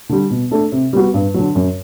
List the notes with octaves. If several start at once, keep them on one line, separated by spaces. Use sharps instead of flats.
D3 G3
B2
A3 D4 A4
C3
G3 B3 F#4
G2
D3 F#3
F#2